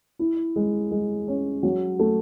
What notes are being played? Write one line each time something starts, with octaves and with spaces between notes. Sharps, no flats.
E4
G#3
G#3
C#4
F#3
A3